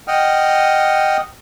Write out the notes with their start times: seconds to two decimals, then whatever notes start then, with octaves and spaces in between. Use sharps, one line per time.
0.08 D#5 F#5 G5 D#6 F6